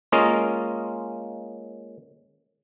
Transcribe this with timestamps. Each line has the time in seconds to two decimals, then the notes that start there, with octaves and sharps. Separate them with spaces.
0.12 G#3 A#3 C#4 F4 D#5